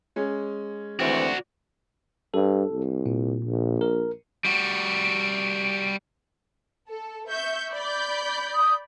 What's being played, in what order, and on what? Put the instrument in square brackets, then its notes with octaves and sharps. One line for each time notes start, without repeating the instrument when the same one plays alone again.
[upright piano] G#3 C#4
[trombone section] D2 E3 C4 [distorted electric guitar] F#4 D5
[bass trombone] G2 [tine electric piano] A4
[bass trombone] C2
[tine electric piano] A#2
[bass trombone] A#1
[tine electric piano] A#4
[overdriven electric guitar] G3 F#4
[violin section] A4
E5 C#6 G6
D5 B5 G6
[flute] D#6